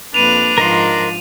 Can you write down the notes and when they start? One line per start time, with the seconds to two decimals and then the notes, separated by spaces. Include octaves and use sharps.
0.14 F2 A#3 D4 B4 D#7 F7
0.58 G#2 F3 A#4 D#5 C6